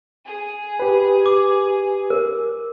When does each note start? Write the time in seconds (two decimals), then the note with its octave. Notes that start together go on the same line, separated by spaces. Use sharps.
0.24 G#4
0.80 G4 B4
1.26 D6
2.10 A#4